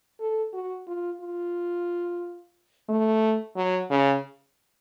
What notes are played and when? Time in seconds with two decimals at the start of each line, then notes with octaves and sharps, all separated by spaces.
0.20 A4
0.53 F#4
0.87 F4
1.21 F4
2.89 A3
3.56 F#3
3.90 C#3